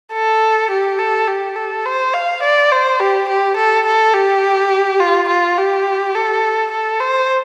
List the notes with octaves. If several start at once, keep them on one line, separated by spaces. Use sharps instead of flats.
A4
G4
A4
G4
A4
C5
F5
D5
C5
G4
G4
A4
A4
G4
F4
F4
G4
A4
A4
C5